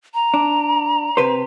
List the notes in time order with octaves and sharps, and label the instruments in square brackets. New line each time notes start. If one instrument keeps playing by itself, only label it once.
[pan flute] A#5
[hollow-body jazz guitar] D4
C3 B4 C5